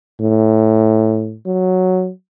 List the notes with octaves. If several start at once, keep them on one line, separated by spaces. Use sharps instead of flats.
A2
F#3